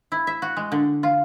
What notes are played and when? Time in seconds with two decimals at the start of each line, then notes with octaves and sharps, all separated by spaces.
0.12 E4
0.27 E5
0.42 F#4
0.57 G#3
0.72 D3
1.03 F4